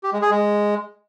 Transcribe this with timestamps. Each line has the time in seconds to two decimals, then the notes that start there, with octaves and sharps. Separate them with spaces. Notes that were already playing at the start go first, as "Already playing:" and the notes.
0.03 G4
0.13 G#3
0.22 G#4
0.31 G#3